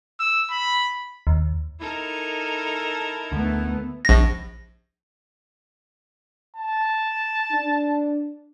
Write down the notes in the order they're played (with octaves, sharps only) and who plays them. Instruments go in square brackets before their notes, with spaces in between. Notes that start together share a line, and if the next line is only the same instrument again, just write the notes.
[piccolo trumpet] E6
B5
[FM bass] D#2
[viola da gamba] D#4 A4 A#4 [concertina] E4
[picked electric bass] D2 D3 [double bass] A3 B3
[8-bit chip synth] A#1 A#6
[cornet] A5
[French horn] D4